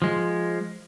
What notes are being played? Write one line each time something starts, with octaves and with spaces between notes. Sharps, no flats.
F3 G#3